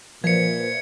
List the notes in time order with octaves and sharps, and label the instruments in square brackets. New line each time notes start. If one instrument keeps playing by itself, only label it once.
[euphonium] A#2 [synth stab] F3 [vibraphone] B4 C5 E5 [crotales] G#6 C#7